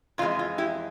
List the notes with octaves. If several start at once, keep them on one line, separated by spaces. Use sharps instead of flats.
F2 C3 E3 G#3 F4
F4
E4 G4